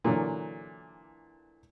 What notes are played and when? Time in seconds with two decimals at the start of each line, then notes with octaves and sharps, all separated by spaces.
0.04 A#2 D3 E3 F#3